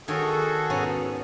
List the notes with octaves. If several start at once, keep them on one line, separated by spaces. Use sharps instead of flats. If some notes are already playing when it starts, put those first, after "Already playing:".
D#3 F#4 G#4 A4 C#5
G#2 B2 C#4